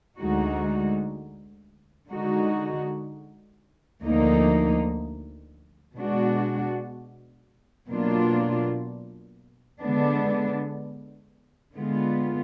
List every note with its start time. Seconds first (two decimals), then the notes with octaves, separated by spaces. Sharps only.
0.18 D2 D3 G#3 D#4 F#4
2.11 D3 G#3 D#4 F#4
4.03 D2 D3 F3 A#3 D#4
5.96 B2 G#3 D4 F#4
7.89 B2 F#3 A#3 D4 F4
9.81 D3 G#3 B3 D4
11.74 D3 G#3 B3 F4